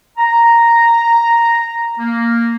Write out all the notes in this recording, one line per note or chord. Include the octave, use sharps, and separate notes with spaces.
A#5
A#3